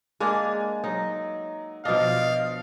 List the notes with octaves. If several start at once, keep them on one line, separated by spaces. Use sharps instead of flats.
G#3 A#3 D4 G#5
F#3 D#4
B2 F3 D4 D#5 F5